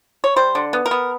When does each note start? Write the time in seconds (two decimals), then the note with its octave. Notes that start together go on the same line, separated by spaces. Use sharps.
0.24 C#5
0.36 G3 C5
0.55 D3
0.73 B3
0.86 A#4
0.91 B3